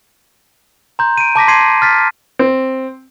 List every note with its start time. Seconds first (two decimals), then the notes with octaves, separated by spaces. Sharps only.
0.99 A#5 C6 G6
1.17 D7 D#7
1.36 A5 D6 A#6 B6
1.48 C6 G#6 C7 D#7
1.82 F6 A6 B6
2.39 C4